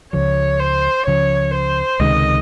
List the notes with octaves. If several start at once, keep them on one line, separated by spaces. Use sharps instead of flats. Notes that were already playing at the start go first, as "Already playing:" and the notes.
C#2 C#3 F3 C#5
C5
C#2 C#3 F3 C#5
C5
C#2 C3 D#3 G#3 D#5